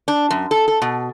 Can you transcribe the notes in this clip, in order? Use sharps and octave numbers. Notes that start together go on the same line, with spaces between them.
D4
F#2
A4
A4
B2